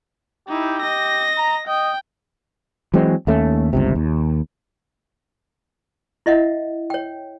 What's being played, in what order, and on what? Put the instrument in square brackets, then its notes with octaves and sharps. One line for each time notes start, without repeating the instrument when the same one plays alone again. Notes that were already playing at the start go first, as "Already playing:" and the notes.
[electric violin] D#4 E4 [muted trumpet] G4
[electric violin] D#5 A#6
[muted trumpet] A#5
[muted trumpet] D#5 [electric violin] G5
[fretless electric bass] E3 F#3 G#3 C4
D#2 A3 C#4
G1 C#2 C3
D#2
[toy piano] E4 D#5 E5 F#5
C#5 G5